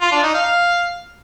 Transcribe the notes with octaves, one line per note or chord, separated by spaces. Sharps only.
F4
D4
D#4
F5